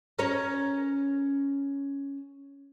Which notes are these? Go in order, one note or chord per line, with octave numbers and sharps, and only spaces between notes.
C#4 A#4 C#5